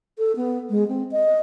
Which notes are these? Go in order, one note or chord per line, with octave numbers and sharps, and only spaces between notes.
A4
B3
G#3
C4
D#5